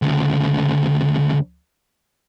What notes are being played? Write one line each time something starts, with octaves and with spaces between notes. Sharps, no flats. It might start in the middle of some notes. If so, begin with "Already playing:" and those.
D2 C#3